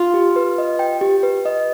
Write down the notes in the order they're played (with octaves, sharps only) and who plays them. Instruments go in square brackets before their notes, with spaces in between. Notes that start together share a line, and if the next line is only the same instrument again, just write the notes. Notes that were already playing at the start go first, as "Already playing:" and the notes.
Already playing: [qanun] F4
[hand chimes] G4
B4
D#5
G5
G4
B4
D#5